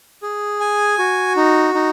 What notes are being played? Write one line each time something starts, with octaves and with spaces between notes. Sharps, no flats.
G#4
G#5
F#4
D#4
D#4